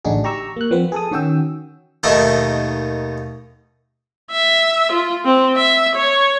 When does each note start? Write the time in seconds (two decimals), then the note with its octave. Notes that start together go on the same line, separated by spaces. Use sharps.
0.05 A1 D3 D4 D#4 F#4 G#4
0.24 G4 A#5 C#6 E6
0.56 A#3 F#6
0.71 F3 B3 C4 B4
0.92 G#4 A4 D#6
1.11 D#3 C#4 F#4 G5 E6
2.03 D#2 B2 D#3 A3 D#5 E5
4.31 E5
4.92 F4
5.25 C4
5.56 E5
5.96 C#5